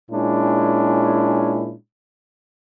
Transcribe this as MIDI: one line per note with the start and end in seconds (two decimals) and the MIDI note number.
0.11 1.74 46
0.11 1.74 56
0.11 1.74 61
0.11 1.74 62
0.11 1.74 64